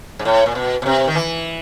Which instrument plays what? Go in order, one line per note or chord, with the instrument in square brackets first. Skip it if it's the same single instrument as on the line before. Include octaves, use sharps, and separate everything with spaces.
[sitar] G#2
A2
A#2
B2
B2
C3
D#3
E3